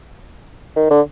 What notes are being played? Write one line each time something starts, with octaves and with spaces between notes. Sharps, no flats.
D#3
D3